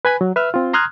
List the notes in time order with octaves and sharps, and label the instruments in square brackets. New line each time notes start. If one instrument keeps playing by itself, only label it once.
[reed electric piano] B4 G#5 B5
F#3
B4 E5 E6 F6
C4 F4
A#5 C6 D#6 F6 F#6 G#6